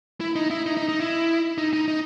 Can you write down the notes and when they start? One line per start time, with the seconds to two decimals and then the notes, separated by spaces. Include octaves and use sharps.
0.20 E4
0.35 D#4
0.51 E4
0.66 D#4
0.77 D#4
0.89 D#4
1.00 E4
1.58 D#4
1.73 D#4
1.88 D#4